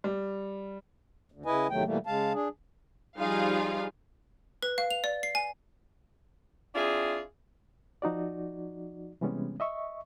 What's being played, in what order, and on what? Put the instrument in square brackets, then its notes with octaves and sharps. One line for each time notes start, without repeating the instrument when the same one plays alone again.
[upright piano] G3
[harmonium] D2
C#3 E4 B4 D#5 G#5
E2 C3 D#3 F#3 A3 G5
B2 E3 G3 A3 A#3
C#3 G#3 F5 A5
D4 G#4
[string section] F3 G3 D#4 F4 G#4 F5
[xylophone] B4
F5
F7
D5
C7
G#5
[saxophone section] C4 D4 E4 F4 G#4
[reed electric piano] F3 D#4 F#4 D5
C3 E3 G3 G#3 B3 C#4
D#5 E5 C#6